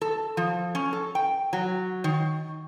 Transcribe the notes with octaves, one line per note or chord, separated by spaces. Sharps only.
A4
F3
C#4
A4
G5
F#3
D#3